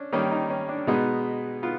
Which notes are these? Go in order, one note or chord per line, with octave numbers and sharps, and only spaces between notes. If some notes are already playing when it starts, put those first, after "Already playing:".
Already playing: C#4 D4
D#3 G3 A#3 C#4 D#4
D#4
C#4
D4
B2 G#3 B3 D#4
B3 F4